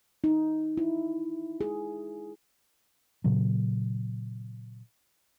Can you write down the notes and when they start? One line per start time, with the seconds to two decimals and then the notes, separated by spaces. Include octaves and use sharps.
0.24 D#4
0.77 E4
1.61 G#4
3.24 A#2 C#3 F#3